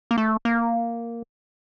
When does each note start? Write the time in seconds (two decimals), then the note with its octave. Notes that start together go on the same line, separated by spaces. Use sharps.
0.11 A#3
0.18 A3
0.45 A#3